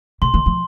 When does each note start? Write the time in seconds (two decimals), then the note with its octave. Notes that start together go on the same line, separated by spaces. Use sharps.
0.22 C3 C6
0.34 D#3
0.46 F3